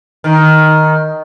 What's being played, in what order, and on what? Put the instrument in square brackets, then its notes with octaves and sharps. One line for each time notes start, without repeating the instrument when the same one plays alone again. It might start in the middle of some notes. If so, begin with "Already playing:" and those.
[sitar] D#3